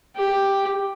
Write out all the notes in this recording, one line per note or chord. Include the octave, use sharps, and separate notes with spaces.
G4